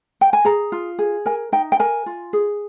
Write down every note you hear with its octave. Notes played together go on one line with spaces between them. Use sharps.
G5
G#5
G#4 A#5
F4
G#4
A#4 G#5
D#4 G5
G5
A#4 G#5
F4
G#4